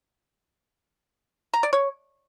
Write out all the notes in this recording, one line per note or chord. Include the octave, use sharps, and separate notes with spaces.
A#5
D5
C#5